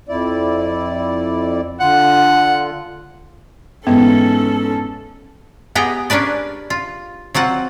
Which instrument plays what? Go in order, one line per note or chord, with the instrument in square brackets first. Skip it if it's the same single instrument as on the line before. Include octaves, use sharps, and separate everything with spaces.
[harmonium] F2 E4 D5
[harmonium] D3 F4 [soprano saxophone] F#5
[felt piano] G#2 E3 G#3 [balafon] B3 [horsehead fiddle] C#4 A4
[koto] B3 G4 G#4 G5 A#5
C#4 D4 A#4 B4 D5
F4
F#3 C4 F4 F#5